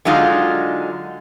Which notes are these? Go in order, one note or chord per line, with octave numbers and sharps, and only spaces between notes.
D3 F#3 G#3 D#4 F4